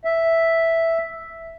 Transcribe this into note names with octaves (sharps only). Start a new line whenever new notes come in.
E5